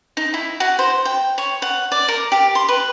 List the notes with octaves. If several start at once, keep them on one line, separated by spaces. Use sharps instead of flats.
D#4
E4
F#4
C5
G5
C#5
F#5
D5
A#4
G4
C6
B4